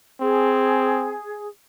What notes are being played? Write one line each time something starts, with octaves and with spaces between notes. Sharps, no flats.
C4 G#4